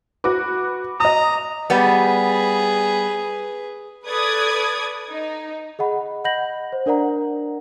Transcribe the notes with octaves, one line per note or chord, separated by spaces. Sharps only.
F#4 B4 D6
D#5 A#5 D#6
G3 B3 G#4 B4
A4 B4 D5 D#6 G#6
D#4
G#4 D#5 F#5 B5
D#5 F#5 B5 G6 A#6 F#7
C5
D4 A#4 D5 F#5 A#5